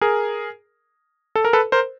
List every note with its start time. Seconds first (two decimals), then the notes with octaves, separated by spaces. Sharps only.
0.01 G#4 A#4
1.36 A4
1.45 A#4
1.53 A4 B4
1.72 A#4 C5